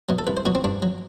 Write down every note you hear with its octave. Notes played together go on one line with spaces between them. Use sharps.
B2 F#3
A4
C2 B4
C5
B2 F#3 F#4
C4
G2 D4
F#3